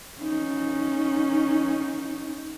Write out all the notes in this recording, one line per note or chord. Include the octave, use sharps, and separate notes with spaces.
C#4 D#4